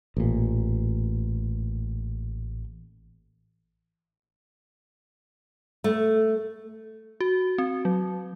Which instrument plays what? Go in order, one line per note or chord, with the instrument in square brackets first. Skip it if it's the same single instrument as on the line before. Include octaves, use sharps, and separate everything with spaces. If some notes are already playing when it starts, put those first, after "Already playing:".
[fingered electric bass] A1 A#2
[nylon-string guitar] A3
[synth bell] F#4
C4
F#3